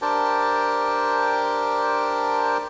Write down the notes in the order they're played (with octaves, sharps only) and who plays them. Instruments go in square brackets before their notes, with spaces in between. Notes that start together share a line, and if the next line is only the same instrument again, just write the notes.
[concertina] D4 G4 A#4 C5 G5 A5